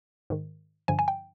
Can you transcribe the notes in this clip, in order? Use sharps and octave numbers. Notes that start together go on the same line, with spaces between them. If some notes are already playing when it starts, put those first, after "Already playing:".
G#2 D#3
G2 D3 F3 G#5
G#5
G5